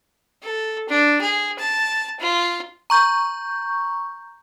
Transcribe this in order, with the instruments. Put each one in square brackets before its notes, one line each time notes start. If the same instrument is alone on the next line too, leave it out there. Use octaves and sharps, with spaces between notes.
[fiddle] A4
D4
G#4
A5
F4
[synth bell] A#5 C#6 G6